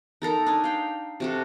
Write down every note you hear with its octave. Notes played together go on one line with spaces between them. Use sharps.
D#4 A4 A#4 A#5
D4 D#4 G#5
F5 G5
C3 F#4 A4